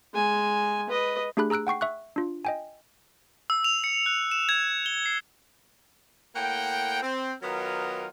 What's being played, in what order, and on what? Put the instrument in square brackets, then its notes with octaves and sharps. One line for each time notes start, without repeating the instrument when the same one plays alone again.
[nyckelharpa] G#3 G#5
B4 D#5
[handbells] A3 D4 G4 G#4 B5 F#6
G#4 A#5 E6 F#6 D7
F#5 G5 C#6 C7
E5 C#6 F#6
D4 F4
D#5 G5 G#5
[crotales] E6
F7
C#7
F#6
E7
G#6
G7
C7
[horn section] A2 A#3 F#5 G5
C4
D#3 F#3 B3 D#4 F4 A#4